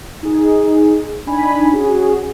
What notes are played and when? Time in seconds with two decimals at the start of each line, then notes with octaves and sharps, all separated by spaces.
0.23 D#4 G#4
1.27 D4 D#4 G#5 B5
1.71 C#4 F#4 G#4